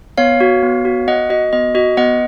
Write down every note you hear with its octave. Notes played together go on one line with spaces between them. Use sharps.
B3 C#5 F5
F#4
B3
F#4
B3 D#5 F#5
F#4 D#5
B3 D#5
F#4 D#5
B3 D#5 F#5